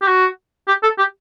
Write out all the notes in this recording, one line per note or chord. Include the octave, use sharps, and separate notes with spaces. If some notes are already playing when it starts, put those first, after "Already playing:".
G4
F#4
G4
A4
G4